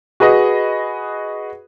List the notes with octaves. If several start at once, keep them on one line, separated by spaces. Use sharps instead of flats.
F#4 G#4 B4 D#5